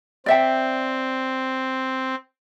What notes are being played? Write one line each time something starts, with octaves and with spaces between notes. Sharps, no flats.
C4 D5 E5 G5